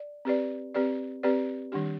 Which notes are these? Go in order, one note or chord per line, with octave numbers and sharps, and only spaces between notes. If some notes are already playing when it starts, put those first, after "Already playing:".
Already playing: D5
C4 G4 B4 D5
C4 G4 B4 D5
C4 G4 B4 D5
D#3 G3 D4 G4